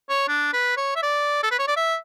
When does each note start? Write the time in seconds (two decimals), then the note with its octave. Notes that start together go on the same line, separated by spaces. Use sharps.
0.10 C#5
0.28 D4
0.53 B4
0.77 C#5
0.96 E5
1.02 D5
1.43 A4
1.51 B4
1.59 C#5
1.68 D5
1.77 E5